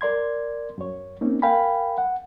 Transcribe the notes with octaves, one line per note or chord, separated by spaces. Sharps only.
A#4 D5 C6 G#6
F#2 C#5
A#3 C4 C#4 D#4
A#4 F5 G5 G#5 B5
F#5